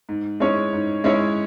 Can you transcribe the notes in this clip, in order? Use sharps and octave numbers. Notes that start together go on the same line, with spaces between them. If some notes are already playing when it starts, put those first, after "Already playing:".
G#2
G#3 C#4 E4 C#5
G#2
G#3 C#4 E4 C#5